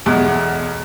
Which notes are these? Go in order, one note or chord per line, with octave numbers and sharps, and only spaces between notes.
B1 E2